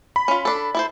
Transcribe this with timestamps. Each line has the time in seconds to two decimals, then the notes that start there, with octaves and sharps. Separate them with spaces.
0.16 B5
0.28 C#4 F4
0.45 D4 A4
0.75 E4 A4 C5